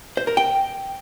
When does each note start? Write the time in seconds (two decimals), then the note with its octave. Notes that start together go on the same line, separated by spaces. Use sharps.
0.17 C5
0.27 A#4
0.37 G5